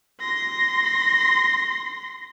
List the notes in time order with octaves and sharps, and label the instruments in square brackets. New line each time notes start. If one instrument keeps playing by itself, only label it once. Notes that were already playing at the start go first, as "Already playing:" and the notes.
[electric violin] C6 A#6